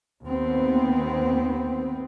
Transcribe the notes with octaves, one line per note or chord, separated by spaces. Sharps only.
D#2 B3 C4